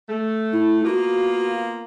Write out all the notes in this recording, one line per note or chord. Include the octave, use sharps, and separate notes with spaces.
A3
E4
A#3 B3 F4 F#4